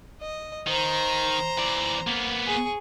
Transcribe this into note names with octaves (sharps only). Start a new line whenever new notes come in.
D#5
D#3 C5 A#5
E3 D5
A#3 B3
G#4 C#6